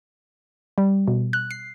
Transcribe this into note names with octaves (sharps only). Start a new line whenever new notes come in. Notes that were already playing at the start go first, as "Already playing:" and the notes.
G3
B2
F#6
C7